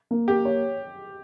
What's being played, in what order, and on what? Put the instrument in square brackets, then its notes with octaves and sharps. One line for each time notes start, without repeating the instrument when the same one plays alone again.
[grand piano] A#3
[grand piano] A#3 [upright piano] G4
[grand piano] C#5